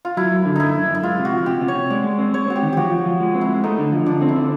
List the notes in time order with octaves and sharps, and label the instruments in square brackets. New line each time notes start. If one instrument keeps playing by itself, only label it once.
[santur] F4
[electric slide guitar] F#3 [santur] E4
[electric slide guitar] F#2
D3
[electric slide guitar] F#2 [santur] D#4 E4
[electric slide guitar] F#2
F#2
[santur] E4
[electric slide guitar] G#3 [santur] F4
[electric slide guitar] C3
[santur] F#4
[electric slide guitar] F3
[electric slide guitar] C3 [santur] G4
[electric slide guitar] C3
[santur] C#5
[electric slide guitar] C3
[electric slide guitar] G#3 [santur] D5
[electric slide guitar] G#3
C4
[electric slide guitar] G#3 [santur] C#5
[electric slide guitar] C4 [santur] F#4
[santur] G4
[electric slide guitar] D#3
[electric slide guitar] F3 [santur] F#4 G4
[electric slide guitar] F3
F3
G#3
C4
[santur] E4
[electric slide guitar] G#3
[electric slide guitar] A3 [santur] D#4
[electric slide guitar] D3
F3
[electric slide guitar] D3 [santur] D4
[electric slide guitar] C4
[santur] E4
[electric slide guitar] D3